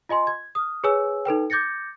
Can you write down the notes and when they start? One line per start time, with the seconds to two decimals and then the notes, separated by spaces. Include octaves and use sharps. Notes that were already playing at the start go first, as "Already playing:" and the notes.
0.09 F4 D#5 G#5 C6
0.27 G#6
0.55 D#6 F6
0.84 G#4 B4 C#5 G#5 E6
1.25 D#4 A4 B4 G5
1.50 D6 G6 A6 A#6 C#7